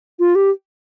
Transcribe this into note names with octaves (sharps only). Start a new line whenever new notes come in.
F4
G4